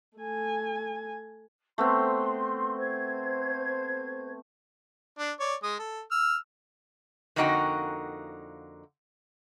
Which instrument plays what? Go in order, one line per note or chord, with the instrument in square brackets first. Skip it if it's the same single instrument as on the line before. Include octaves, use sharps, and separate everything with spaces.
[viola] A3 G#5
[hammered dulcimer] A3 B3 C4 [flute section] C6
[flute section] C5 G#6
[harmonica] D4
C#5 D5
G#3 D#6
A4
E6 F6
[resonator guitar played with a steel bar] F2 D3 A#3 D#4 F#4 G5